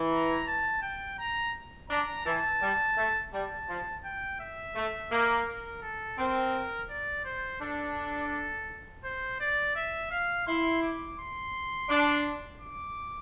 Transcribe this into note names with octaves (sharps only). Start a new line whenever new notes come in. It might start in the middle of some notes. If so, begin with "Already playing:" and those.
Already playing: E3
A#5
A5
G5
A#5
D4 A#5
E3 A5
G3
A3
G3 A5
F3
G5
E5
A3
A#3
A#4
A4
C4 A#4
D5
C5
D4 A4
C5
D5
E5
F5
E4 C6
D6
C6
D4
D6